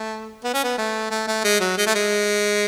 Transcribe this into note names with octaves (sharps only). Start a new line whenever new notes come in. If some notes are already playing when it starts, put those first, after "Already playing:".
Already playing: A3
B3
C#4
B3
A3
A3
A3
G#3
F#3
G#3
A3
G#3